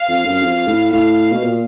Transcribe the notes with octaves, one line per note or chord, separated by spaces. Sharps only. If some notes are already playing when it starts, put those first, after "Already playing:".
Already playing: F5
F2
F#2
F2
A2
A2 F5
B2
A#2